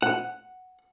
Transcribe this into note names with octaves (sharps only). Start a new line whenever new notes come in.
F#5